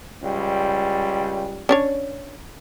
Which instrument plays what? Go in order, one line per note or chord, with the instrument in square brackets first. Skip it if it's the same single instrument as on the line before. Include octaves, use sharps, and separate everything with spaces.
[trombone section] C#2 G3
[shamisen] C#4 D4 C#5